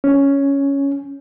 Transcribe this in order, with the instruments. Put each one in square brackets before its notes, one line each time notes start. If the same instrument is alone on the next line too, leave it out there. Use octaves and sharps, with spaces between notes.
[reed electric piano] C#4